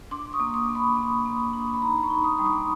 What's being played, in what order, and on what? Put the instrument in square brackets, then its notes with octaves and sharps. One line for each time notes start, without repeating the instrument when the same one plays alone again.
[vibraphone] D4 C6 D6
D6
C#6 D#6
A#3
C6 D6
A#3
B5 C#6
A#3
A#3
D4
B5
D#4 A#5 C6
B5 C#6
D#4
C#6 D#6
G3
C6 D6